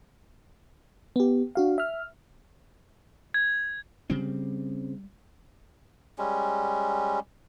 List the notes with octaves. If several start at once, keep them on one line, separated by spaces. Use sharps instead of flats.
B3 G4
D4 F#4 F5
E5 F6
G#6
C#3 G3 C4
G3 G#3 C#4